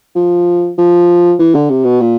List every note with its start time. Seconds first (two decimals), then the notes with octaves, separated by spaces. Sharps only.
0.16 F3
0.78 F3
1.39 E3
1.55 D3
1.70 C3
1.84 B2
2.01 A#2